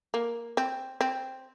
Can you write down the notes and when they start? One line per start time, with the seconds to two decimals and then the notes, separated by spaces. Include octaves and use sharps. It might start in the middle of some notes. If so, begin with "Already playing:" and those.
0.14 A#3
0.57 C4
1.01 C4